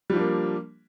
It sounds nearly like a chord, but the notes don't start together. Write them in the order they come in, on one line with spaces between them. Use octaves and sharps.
G3 F3 D4 A#3